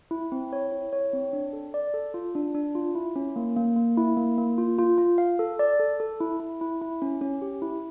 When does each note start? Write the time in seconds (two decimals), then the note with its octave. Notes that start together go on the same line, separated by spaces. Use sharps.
0.11 E4
0.32 C4
0.53 C#5
0.72 E4
0.93 C#5
1.13 C4
1.33 D4
1.53 A4
1.74 D5
1.94 A4
2.14 F4
2.35 D4
2.55 D4
2.75 F4
2.95 E4
3.16 C#4
3.36 A#3
3.57 A#3
3.76 A#3
3.97 E4
4.17 A#3
4.38 A#3
4.58 F4
4.79 F4
4.98 F4
5.18 F5
5.39 A4
5.59 D5
5.80 A4
6.00 A4
6.21 E4
6.40 E4
6.61 E4
6.82 E4
7.02 C#4
7.21 C#4
7.42 G4
7.62 E4